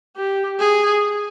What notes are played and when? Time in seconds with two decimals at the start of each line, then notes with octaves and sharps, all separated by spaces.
0.16 G4
0.59 G#4